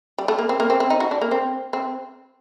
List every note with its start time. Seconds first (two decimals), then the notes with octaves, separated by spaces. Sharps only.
0.18 G3
0.28 A3
0.39 A#3
0.49 C4
0.60 A#3
0.70 C4
0.80 C4
0.90 D#4
1.00 F#4
1.11 D4
1.21 A#3
1.31 C4
1.73 C4